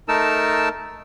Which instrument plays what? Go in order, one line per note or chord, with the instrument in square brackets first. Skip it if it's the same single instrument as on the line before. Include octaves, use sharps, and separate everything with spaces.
[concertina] A3 D#4 A#4 A5 E6